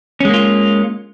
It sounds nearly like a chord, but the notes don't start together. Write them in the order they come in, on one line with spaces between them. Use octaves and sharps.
C#4 G#3 A#3 F4